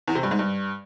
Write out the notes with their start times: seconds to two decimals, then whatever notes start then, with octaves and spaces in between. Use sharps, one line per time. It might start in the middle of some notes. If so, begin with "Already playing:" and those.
0.07 E2
0.15 C3
0.23 G2
0.31 G#2
0.39 G2